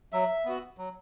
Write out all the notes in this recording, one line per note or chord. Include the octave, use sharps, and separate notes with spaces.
F#3 E5
B3 F#4
F#3